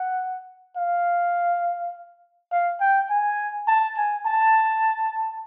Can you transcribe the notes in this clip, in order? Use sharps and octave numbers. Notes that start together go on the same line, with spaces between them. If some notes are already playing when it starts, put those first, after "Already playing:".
Already playing: F#5
F5
F5
G5
G#5
A5
G#5
A5